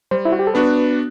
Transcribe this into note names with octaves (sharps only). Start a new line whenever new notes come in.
G3 C5
E4
F#4
G4
A4
B3 D4 F#4 B4